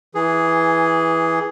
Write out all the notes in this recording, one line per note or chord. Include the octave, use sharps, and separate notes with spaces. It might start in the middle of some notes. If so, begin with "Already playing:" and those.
E3 G#4